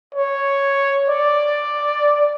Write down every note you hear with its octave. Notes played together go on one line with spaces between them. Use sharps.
C#5
D5